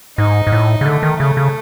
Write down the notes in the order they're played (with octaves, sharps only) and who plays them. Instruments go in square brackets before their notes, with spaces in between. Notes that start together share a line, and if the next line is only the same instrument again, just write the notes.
[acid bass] G#2 [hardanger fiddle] D#4
[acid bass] G#2
A2
C#3
[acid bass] D3 [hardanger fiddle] A3
[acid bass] D#3
[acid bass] C#3 [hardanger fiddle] A3
[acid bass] C#3